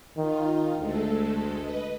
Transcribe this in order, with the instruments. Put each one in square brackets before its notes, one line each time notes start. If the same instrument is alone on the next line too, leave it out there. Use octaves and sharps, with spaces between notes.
[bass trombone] D#3 [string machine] D#4 F4
[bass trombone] D2 [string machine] G#3 A3 A4
[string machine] B4 D#5